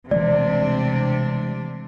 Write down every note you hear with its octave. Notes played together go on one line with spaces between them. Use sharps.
C3 E3 G#3 A3 D4 D5